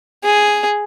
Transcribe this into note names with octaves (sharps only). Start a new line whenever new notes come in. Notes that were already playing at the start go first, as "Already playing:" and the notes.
G#4